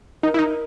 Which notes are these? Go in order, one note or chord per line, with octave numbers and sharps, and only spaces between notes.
D#4 A#4
E4
D#4